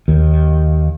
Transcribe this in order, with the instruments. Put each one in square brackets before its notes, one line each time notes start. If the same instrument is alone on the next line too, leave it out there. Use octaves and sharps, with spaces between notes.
[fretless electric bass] D#2